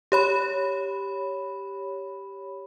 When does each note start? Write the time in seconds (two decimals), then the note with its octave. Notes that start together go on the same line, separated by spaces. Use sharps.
0.12 G4 C#5 B5